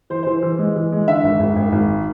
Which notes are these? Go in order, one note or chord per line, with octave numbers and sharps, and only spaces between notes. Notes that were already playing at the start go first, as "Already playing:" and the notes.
E3 C5
C5
E3
E3
G#3
E3
G#3
D3 E5
G#1
G#1
G#1
G#1